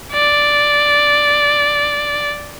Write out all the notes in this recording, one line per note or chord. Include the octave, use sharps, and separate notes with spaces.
D5